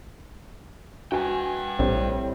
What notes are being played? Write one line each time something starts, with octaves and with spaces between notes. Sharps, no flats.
F#4 B4 G5 G#5
A#1 A2 G3 C4